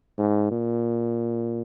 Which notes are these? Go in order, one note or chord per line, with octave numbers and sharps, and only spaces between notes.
G#2
A#2